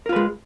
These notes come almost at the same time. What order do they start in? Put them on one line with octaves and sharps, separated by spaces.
A#4 F4 B4 G#3